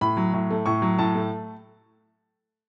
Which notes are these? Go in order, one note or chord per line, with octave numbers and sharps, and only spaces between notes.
A2 B5
F#3
A2
A3
A2 C#6
F#3
A2 A5
A3